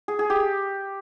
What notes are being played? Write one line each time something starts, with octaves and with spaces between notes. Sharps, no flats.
G#4
G#4
G4